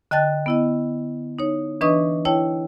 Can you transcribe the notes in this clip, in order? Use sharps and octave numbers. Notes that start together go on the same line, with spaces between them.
D3 D#5 G5 A5 F#6 A6
B3 E4 D#5
D#4 C#5
E3 D4 B4 D#5 C#6 D#6
E4 C#5 G5 A5